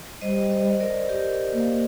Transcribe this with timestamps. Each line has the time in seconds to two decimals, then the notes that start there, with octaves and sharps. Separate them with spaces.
0.22 G3 C5 D#5
0.51 C5 D#5
0.80 A#4 D5
1.09 G4 A#4
1.53 A#3